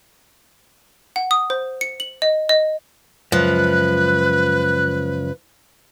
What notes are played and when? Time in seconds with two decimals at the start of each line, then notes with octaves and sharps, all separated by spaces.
1.16 F#5
1.31 D#6
1.50 C5
1.81 C#7
2.00 F#7
2.22 D#5
2.49 D#5
3.32 C#2 F#2 F3 B4 F#6